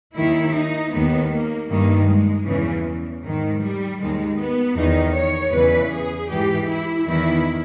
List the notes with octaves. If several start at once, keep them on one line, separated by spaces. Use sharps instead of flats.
D#2 D#3 E4
D#4
D#2 D#3 B3
A#3
G2 D#3 A#3
G#3
E2 C#3 E3
G#2 D#3
G3
D#2 D#3 G#3
B3
E2 D#3 D#4
C#5
E2 C#3 E3 B4
G#4
G#2 E3 G4
E4
E2 D#3 E4